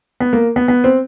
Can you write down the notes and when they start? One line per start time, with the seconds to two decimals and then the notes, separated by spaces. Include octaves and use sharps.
0.20 B3
0.33 A#3
0.56 B3
0.68 B3
0.84 C4